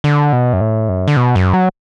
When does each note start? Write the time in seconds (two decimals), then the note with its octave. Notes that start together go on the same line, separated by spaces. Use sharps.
0.04 D3
0.33 B2
0.53 F#2
0.61 A2
0.89 F#2
1.08 D3
1.17 B2
1.35 F#2
1.53 F#3